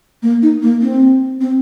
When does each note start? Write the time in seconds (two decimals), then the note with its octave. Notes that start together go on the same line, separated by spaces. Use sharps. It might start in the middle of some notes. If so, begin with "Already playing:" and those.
0.23 A#3
0.43 D#4
0.63 A#3
0.82 C4
1.41 C4